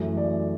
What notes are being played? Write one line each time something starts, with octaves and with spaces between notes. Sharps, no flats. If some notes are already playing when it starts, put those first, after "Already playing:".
Already playing: F#2 E3 A3
D5